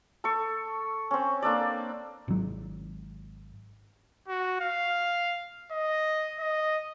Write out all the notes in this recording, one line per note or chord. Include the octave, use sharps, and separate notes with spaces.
A4 C#6
C4 C#4
A#3 D4 A4 D5
G#1 F#3
F#4
F5
D#5
D#5